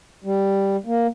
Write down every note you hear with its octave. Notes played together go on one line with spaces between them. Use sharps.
G3
A#3